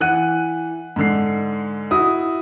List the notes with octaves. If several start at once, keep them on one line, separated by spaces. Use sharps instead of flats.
E3 F#5 F#6 D#7
G#2 D3 C7
E4 F#4 D#6